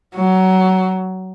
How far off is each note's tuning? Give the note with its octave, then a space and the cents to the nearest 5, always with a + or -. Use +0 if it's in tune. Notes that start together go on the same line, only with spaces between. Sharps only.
F#3 +20